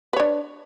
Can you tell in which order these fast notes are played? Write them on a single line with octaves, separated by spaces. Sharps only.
B4 C#5 D4